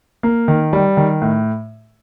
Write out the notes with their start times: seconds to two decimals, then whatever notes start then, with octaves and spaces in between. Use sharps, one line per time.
0.23 A#3
0.48 D#3
0.73 G3
0.97 D#3
1.22 A2